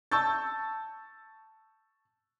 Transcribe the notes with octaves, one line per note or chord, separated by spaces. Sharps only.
A5 C#6 E6 G6 A6